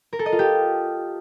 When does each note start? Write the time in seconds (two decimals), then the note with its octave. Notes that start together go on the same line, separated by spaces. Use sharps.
0.13 A#4
0.19 A4
0.26 D#5
0.32 F4
0.39 G4